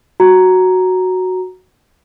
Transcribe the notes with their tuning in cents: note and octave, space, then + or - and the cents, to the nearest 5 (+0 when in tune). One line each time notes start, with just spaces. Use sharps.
F#4 +0 A#5 +0